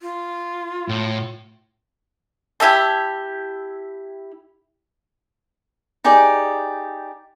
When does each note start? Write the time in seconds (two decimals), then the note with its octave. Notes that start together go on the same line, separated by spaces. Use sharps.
0.01 F4
0.88 A2
2.60 E4 G4 E5 A5
6.04 D#4 G4 G#4 D5